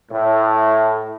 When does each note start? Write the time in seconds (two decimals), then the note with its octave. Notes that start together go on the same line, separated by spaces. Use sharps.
0.11 A2